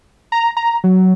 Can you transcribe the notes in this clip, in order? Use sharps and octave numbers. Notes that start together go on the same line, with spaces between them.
A#5
A#5
F#3